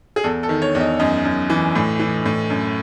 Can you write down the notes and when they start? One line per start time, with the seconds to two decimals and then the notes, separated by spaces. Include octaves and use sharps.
0.16 G#4
0.24 E2 A4
0.43 A4
0.49 D#3
0.62 C#5
0.75 E2
0.80 D#5
0.99 F#2 D#5
1.25 F#2
1.50 E3
1.75 A2
1.99 E3
2.26 A2
2.50 F#2